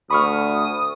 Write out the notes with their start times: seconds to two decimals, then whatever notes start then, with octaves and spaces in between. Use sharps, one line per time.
0.11 D2 B5 C#6 D#6 F6